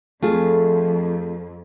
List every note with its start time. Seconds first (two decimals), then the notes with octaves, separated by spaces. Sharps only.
0.23 F2 A3 F4 G#4